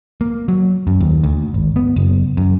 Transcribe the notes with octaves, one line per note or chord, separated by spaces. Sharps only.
A#3
F#3
F#2
D#2
D2
G#1
B3
F#1
F#2